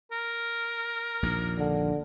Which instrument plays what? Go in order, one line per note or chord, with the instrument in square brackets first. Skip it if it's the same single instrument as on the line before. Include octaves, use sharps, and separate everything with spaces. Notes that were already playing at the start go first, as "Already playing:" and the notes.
[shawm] A#4
[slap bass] A#1 D#2
[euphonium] D3